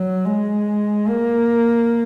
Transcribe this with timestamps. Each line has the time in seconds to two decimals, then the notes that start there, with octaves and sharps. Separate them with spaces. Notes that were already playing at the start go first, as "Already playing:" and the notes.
Already playing: F#3
0.25 G#3
1.07 A#3